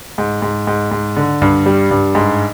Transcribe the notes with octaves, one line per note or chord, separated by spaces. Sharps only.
G#2
G#2
G#2
G#2
D3
G2
G3
G2
G#2